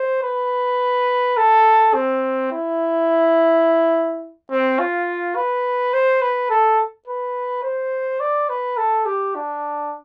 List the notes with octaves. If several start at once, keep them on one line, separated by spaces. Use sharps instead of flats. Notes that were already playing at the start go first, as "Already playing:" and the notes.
Already playing: C5
B4
A4
C4
E4
C4
F4
B4
C5
B4
A4
B4
C5
D5
B4
A4
G4
D4